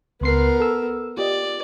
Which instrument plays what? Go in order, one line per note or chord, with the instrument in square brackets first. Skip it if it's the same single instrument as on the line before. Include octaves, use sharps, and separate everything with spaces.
[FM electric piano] C#2 C6 C7 [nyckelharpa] B3 A#4
[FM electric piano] A4 E6
[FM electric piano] F4 G4 D#5 [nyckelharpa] D5